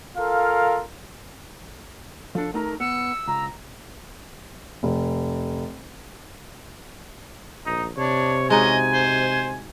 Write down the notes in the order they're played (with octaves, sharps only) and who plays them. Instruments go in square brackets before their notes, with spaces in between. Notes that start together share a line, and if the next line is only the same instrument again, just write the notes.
[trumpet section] F4 A4 A#4 F5
[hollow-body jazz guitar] F3 D4 [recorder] A4
[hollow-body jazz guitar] A3 D#4 A#5 [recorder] A#4
[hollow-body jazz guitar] B3 [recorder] E6 [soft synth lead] C#7
[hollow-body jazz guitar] C#2 [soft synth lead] A#5
[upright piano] F1
[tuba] A#1 [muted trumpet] D#4
[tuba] C3 [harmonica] D4 [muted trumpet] C#5
[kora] G#3 D#4 F#4 [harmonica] C#4 D#5 [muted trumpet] G#5
[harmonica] C5